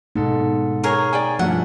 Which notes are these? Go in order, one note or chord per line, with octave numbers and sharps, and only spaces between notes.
G#2 B2 D#4 A4
G#4 A#4 C#5
D5 G5 G#5
G2 F3 A3 F#4 E5 F#5